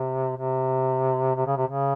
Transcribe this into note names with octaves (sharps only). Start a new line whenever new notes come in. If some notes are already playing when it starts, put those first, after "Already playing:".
Already playing: C3
C3
C3
C#3
C3
C#3